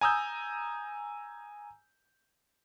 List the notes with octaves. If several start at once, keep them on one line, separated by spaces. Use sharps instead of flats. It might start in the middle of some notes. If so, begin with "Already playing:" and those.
G#5 A#5 D#6 E6 G6